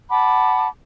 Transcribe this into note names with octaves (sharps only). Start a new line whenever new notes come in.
F#5 A5 B5 D6